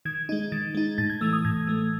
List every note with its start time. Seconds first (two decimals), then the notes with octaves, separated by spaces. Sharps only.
0.05 D#3 G#6
0.29 G#3 D#4
0.52 D#3 A6
0.75 G#3 D#4
0.98 A2 A6
1.10 G#6
1.21 E3 A3 E6
1.33 D#6
1.45 A2 G#6
1.67 E3 A3